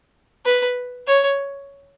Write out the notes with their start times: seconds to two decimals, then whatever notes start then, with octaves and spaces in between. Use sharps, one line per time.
0.45 B4
1.07 C#5